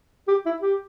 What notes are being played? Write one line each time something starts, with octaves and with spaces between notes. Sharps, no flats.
G4
E4
G4